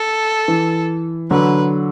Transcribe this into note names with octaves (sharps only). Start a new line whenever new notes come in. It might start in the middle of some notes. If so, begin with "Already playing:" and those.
Already playing: A4
E3
D3 F#3 B4